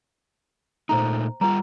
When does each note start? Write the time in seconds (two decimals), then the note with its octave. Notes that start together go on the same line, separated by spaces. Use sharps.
0.89 A#2 A3 D#4 C5 A#5
1.41 G3 F4 G#4 B4 A#5